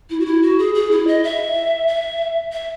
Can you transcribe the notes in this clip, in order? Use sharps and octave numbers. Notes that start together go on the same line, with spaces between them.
E4
F#4
E4
F#4
G#4
G#4
E4
D#5
E5
E5
E5